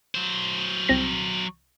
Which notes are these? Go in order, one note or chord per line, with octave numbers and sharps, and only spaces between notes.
F#3 C5
C2 C4 A#6